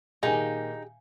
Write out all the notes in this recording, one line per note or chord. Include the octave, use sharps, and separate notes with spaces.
A#2 D#3 D#4 G4 G#4 F5 G#5